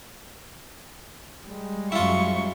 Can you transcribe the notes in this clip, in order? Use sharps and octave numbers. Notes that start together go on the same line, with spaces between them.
G3 G#3
F#2 E4 F4 C#6